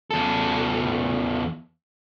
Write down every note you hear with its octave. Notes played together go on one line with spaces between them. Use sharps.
E2 A4